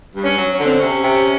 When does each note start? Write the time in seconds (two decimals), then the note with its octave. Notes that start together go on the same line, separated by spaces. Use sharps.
0.16 G2
0.23 C#4
0.38 F#3
0.52 C#4
0.60 D3 C4
0.77 C3 C#4
1.04 C3